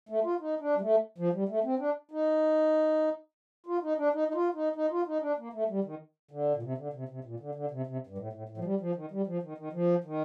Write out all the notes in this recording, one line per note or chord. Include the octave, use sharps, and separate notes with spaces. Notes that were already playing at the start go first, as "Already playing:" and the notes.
A3
F4
D#4
D4
G3
A3
F3
G3
A3
C4
D4
D#4
F4
D#4
D4
D#4
D#4
F4
D#4
D#4
F4
D#4
D4
A#3
A3
G3
D#3
D3
A#2
C3
D3
C3
C3
A#2
D3
D3
C3
C3
G2
A2
A2
A2
F3
G3
F3
D#3
G3
F3
D#3
D#3
F3
D#3